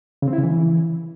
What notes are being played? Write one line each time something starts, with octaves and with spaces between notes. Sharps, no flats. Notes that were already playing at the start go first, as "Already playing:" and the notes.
C#3
C4
E4
C#3
E3